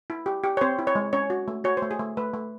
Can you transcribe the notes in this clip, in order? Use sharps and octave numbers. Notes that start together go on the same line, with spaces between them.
E4
G4
G4
C#5
C4 C5
E4
C#5
G#3
C#4 C#5
F#4
A3
F#4 C#5
C5
A3
G#4
A3
A3 B4
A3